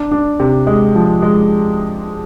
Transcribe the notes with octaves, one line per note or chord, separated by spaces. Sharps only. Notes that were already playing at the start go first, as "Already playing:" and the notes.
Already playing: D4
D4
C3
G#3
F3
G#3